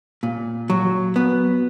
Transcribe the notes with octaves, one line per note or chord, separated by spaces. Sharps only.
A#2
F#3
B3